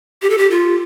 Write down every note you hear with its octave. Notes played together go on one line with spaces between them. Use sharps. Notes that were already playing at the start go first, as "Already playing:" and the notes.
G4
A4
G4
F4